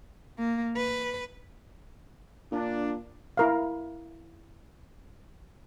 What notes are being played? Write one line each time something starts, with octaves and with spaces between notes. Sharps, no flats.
A#3
B4
A#2 D4
E4 A#4 F5